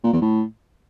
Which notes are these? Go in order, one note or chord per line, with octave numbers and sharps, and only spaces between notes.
A#2
E2
A2